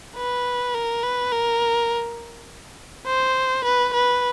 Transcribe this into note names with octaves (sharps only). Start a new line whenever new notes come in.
B4
A#4
B4
A#4
C5
B4
B4